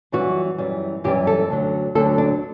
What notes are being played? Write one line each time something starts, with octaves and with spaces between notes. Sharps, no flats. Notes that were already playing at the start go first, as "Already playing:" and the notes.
F#2 E3 G3 F#4
F#2 E3 G3
F#2 E3 G3 G4
A4
D2 D3 F#3
D2 D3 F#3 A4
D4